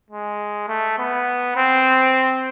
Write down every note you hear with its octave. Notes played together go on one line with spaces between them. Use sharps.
G#3
A3
B3
C4